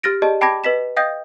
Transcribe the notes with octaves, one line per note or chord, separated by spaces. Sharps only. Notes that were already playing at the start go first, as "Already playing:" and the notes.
G4 F6 A6 A#6 D7
G4 G#4 D5 D#5 A5
G5 A5 B5 D6 G#6 A#6
B4 D#5 B6 E7
D#5 F5 G5 D#6 G6 A#6